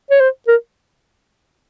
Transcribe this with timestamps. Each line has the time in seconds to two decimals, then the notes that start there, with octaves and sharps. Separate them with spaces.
0.10 C#5
0.20 C5
0.47 A#4